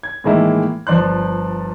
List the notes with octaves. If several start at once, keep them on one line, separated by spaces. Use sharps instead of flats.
G#6
A2 D#3 E3 G#3 A#3 E4
G1 F3 D5 C6 F#6